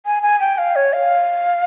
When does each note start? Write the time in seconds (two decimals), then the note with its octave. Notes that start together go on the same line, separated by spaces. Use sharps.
0.06 G#5
0.23 G#5
0.40 G5
0.58 F5
0.76 C#5
0.93 F5